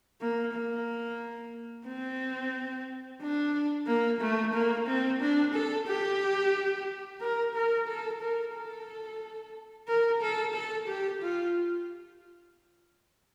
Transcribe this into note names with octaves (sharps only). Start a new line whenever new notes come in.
A#3
A#3
C4
D4
A#3
A3
A#3
C4
D4
A4
G4
A#4
A#4
A4
A#4
A4
A#4
A4
A4
G4
F4